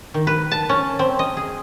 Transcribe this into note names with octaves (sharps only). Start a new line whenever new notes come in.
D#3
B4
A5
C#4
C4
D#5
G#4